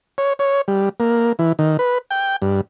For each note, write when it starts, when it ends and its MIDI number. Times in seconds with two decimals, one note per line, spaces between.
0.18 0.33 73
0.39 0.61 73
0.68 0.89 55
1.00 1.32 58
1.39 1.53 52
1.59 1.77 51
1.79 1.98 71
2.11 2.36 79
2.42 2.61 43